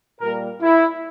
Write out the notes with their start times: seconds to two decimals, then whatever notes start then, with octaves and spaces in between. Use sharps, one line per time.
0.21 A#2 G3 A#3 A#4
0.61 E4